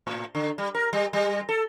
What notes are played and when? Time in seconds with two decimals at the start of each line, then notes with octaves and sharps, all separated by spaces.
0.07 A2
0.35 D3
0.58 G3
0.75 A#4
0.93 G3
1.13 G3
1.49 A4